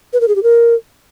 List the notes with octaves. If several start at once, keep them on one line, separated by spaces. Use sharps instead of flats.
B4
A#4
G#4
G4
A#4